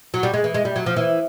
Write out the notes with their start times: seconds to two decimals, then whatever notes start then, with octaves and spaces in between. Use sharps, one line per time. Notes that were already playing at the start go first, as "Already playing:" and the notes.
0.14 F#3
0.23 G3
0.34 G#3
0.44 E3
0.54 G#3
0.65 G3
0.76 F#3
0.86 F3
0.96 E3